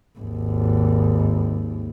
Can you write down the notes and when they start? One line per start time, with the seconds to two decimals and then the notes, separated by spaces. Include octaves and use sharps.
0.19 G#1 D#2